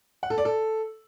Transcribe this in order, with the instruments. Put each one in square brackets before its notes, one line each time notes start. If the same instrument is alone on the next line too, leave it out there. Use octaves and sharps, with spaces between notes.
[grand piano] F#5
A4
D5
A4